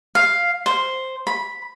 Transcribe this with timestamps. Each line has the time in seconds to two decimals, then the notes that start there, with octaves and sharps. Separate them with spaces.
0.15 F5
0.66 C5
1.27 B5